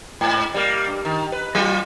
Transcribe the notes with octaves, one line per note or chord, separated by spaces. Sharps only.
G#2
G3 A#3
G2
D#3
B4
F#3 F4